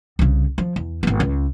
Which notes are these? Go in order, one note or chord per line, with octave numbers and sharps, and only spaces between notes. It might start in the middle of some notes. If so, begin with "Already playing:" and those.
C2 C#3
F3
E2
G#1 B3
C#2